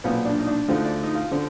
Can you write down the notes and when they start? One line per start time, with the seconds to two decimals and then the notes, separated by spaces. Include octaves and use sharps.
0.04 B1 A#2 F3 B3
0.25 D4
0.39 D#4
0.47 D4
0.68 D2 D3 F3 D#4
0.84 D5
1.03 D#4
1.15 F4
1.31 D3 F3